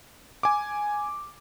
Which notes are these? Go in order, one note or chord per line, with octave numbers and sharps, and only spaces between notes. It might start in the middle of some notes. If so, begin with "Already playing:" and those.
G#5 D6